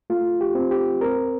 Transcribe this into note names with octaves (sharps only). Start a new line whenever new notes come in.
A3 F4
G4
C4
G4
C4 A#4